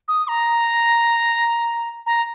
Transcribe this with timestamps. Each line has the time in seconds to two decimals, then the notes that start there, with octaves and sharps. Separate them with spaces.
0.08 D#6
0.28 A#5
2.06 A#5